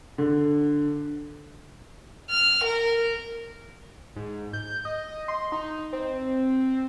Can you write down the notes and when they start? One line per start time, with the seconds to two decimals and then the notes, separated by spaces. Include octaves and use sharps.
0.18 D3
2.30 F6
2.65 A#4
4.16 G#2
4.53 G6
4.85 D#5
5.28 C6
5.52 D#4
5.93 C4